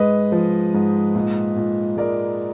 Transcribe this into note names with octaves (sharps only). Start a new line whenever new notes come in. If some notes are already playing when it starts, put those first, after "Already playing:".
Already playing: G#2 G#3 B4 D#5
F3
G#2
A#2
A#2
G#3 A#4 D5